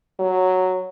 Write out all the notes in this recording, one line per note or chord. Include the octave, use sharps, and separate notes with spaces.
F#3